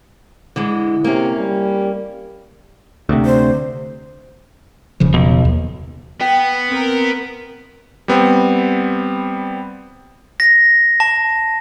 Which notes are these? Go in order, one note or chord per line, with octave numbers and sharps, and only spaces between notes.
D3 E3 G#3
C3 A#3 C#4
G3
D2 C3
C5
E1 C#3 F3
B1
D#2
B3 G5
C4 A#4
G3 B3 C4
A#6
A5